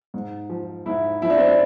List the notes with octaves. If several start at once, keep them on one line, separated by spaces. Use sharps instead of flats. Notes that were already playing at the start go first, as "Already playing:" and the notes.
G#2
F3
G#2 E4
F3 E4
D4
C4
D4